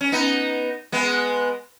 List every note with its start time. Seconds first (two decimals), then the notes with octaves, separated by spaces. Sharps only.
0.01 C#4
0.12 B3 D#4
0.92 G#3 B3